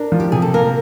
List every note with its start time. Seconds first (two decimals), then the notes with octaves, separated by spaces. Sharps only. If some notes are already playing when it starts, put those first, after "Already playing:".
Already playing: D4 A#4
0.12 F3
0.20 G4
0.32 C3 G#4
0.42 A4
0.54 A#3 A#4